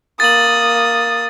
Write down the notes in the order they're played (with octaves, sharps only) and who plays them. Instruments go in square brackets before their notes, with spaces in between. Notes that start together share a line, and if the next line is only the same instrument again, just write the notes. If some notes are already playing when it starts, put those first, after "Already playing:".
[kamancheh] A#3 D#6 [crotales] A6 F#7